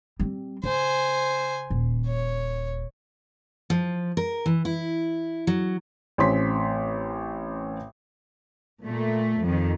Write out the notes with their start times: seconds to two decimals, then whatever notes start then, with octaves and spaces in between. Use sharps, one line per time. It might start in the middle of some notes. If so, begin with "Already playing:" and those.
0.19 G3 C4
0.64 C#3 C5 G#5
1.70 D#1
2.07 C#5
3.70 F3
4.17 A#4
4.46 E3
4.65 E4
5.47 F#3
6.18 A1 C4 C#4 C6 B6
8.84 A#2 A3
9.42 F2 D#3